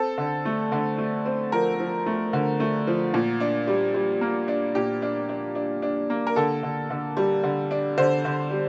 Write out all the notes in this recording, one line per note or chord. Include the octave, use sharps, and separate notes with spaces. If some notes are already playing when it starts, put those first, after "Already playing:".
Already playing: C4 A4
D3
A3
D3
A3
C4
F3 A#4
F3
A3
D3
A3
F3
A#2
D4
G3
G3
A#3
D4
A#2 G4
D4
D4
D4
D4
A#3
A#4
D3 A4
D3
D3
G3
D3
D4
D3 C5
D3
G3